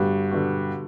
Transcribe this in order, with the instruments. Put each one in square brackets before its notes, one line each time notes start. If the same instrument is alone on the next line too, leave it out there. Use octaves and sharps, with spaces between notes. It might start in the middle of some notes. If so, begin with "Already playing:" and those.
Already playing: [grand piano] G2 [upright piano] D3 G3 B3 F#4
[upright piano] D3 G3 B3 F#4